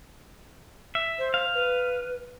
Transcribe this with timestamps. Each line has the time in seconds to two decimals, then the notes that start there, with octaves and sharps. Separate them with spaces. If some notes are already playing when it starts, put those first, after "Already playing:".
0.95 E5
1.19 C5
1.34 F5
1.54 B4